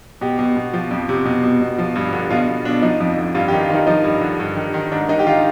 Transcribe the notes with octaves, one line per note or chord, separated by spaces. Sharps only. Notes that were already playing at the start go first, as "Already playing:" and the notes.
B2 G4
B2
B2
F3
F2
C3
B2
B2
B2
F3
G2
D3
B2 F4
B2
B2 D4
F3 D#4
F2
D3
G2 F4
G4
D#3
F4
D#3 D#4
F3 D#4
G2
D3
G2
D#3
D#3
G#2 D4
D#3 D#4
G4
D#3 F4